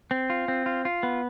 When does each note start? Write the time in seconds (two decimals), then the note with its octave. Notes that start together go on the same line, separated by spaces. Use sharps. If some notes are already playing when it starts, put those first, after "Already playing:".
0.11 C4
0.30 F4
0.48 C4
0.66 F4
0.85 F4
1.03 B3